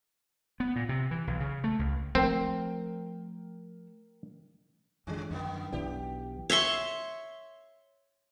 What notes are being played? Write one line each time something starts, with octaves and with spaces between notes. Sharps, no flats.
B3
A#2
C3
E3
B1
C#3
A3
C#2
F3 A3 C4 A#4 G5
F#2 D3 D#3 G#3
F#2 D3 A#3 B3
B1 E3 D4 G4
C#5 E5 C6 C#6